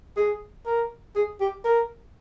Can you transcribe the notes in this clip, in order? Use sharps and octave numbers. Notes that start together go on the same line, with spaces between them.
G#4
A#4
G#4
G4
A#4